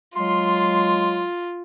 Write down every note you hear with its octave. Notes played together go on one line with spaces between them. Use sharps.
F#3 G#3 F4 C6